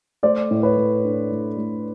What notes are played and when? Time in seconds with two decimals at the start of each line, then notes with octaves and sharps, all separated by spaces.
0.23 A3 C5 D5
0.51 A2
0.63 B4 C#5
0.77 A2
1.05 D4
1.31 A2
1.57 A3